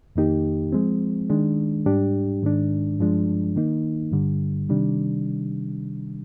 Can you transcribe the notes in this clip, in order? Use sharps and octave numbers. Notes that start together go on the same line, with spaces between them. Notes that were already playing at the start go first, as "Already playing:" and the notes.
F2 D#3 A#3 D#4 G4
F3 G#3 C4
D#3 G#3 D4
G#2 G3 D4 G4
G#2 D#3 G#3 D4
G2 F3 G#3 D4
D#3 A#3 D#4
G2 D3 G3
C3 D#3 G3 D4